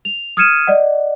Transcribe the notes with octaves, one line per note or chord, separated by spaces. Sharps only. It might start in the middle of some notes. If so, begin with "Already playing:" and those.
F7
D#6 F6 G#6 C#7 D#7 E7
D5 D#5 F#5